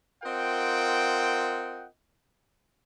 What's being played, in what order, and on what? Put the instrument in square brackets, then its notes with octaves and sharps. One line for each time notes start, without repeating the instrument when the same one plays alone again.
[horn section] C4 F4 A#4 D#5 F#5 G5